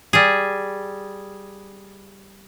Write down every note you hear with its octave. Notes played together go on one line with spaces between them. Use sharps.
G3 G#4